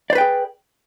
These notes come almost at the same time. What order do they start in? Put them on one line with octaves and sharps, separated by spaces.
D5 C5 B4 G5 G#4